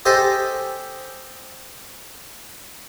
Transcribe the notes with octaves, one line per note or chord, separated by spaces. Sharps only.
G4 A4 C5 D#5 G#5 A5